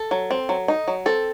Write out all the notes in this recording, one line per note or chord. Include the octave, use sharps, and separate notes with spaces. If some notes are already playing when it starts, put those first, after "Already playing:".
Already playing: A4
F#3
C4
F#3
D#4
F#3
C4 A4